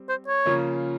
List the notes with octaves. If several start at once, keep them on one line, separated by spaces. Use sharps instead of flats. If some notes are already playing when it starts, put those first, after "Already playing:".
Already playing: G3 C4
C5
C#5
C#3 F3 A#3 C#4 F4